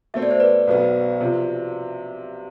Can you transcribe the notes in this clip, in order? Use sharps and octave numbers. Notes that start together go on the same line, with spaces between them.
B2 A3 C4 E5
D5
C5
B4 D5
B1 B2 B3
C3 F3